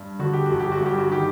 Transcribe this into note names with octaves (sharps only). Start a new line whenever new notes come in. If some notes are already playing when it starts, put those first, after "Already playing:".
Already playing: G2
D3 F#4
G4
G1 F#4
G4
F#4
G2
G4
F#4
D#3 G4